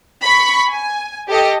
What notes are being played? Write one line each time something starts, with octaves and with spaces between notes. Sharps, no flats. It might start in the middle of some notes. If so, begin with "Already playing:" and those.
B5 C#6 B6
G#5
G4 A4 D#5